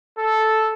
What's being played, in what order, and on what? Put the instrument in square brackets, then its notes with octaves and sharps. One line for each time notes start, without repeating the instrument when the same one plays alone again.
[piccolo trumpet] A4